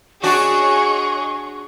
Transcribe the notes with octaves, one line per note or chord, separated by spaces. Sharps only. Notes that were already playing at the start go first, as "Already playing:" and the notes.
D4 F#4 G#4 C#5 D#5 C#6